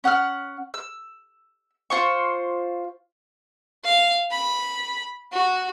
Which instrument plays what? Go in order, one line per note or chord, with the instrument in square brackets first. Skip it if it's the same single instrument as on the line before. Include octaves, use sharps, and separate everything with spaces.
[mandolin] C#4 F#5 D#6 F6
E6
F4 C5 C#6
[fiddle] F5
B5
F#4